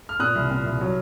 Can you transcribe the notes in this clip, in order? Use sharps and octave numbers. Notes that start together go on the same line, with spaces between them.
F6
A#2 D#6 F#6
C2
A#2
C2
F#3